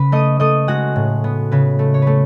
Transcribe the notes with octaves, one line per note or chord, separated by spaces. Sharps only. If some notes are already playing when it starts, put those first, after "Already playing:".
Already playing: C#3 B4 B5
A3 D#5 D#6
A3 D#5 D#6
G#3 F#4 F#5
A2
B3
C#3 B4
A3
C#5
A3 B4